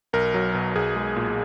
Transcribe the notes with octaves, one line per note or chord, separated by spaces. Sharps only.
B1 A#4
F#3
B2
B1 G#4
G#3
A#2